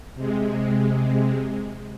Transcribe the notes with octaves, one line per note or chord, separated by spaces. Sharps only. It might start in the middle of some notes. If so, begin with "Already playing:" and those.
C3 G#3